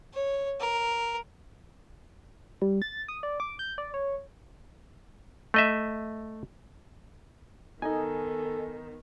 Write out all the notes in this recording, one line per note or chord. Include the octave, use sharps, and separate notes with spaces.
C#5
A#4
G3
A6
D#6
D5
D6
G6
D5
C#5
A3 D#5 E5
D#3 B3 D#4 A4 D#5 G#5